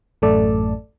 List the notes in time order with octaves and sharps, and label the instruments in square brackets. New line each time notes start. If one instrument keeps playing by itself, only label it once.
[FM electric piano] A1 F#2 A3 A4 D5